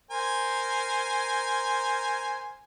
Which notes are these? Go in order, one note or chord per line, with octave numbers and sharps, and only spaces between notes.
A#4 C5 G#5